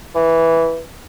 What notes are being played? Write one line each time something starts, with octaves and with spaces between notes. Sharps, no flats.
E3